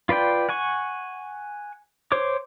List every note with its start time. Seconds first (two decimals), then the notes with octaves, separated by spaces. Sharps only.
0.09 F4 B4 D5 G5
0.49 F#5 G#5 C#6
2.12 C5 C#5 D6